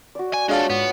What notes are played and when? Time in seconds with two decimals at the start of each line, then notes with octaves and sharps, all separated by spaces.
0.15 F#4 D5
0.33 G#5
0.48 G#3 D4 F4 G#4 A4 C#5 F5 F#5
0.70 G#2 B3